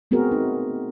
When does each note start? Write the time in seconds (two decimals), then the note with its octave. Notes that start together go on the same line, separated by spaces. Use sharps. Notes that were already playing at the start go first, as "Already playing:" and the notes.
0.11 A3 B3 C4 F#4 G#4 A#4
0.32 D#4